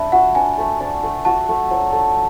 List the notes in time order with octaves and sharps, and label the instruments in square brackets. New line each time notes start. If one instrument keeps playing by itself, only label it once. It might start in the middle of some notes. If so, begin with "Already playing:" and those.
Already playing: [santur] A3 D4 [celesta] E5 B5
[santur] F#4 [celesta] F#5
[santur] D4 [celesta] G#5
[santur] A3
D4
A3
[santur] F#4 [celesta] A5
[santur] A3
F#3
A3